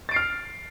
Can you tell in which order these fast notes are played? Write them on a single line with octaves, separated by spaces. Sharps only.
A6 D7 C7 F6